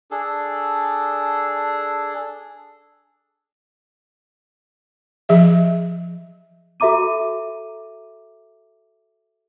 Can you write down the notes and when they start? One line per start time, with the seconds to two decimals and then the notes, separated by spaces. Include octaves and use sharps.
0.11 D4 G#4 A4
5.29 F3 G#4 E5
6.80 F#4 A4 E5 A#5 D6 D#7